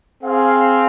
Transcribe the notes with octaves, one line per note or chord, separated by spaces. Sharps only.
C4 G#4 F5